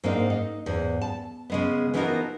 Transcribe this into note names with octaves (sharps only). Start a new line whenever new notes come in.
G#2 A#3 C4 D4 D#4
D#4
E2 G#2
A5
C#3 G#3 B3
E3 F3 B3 D#4 F#4 A#4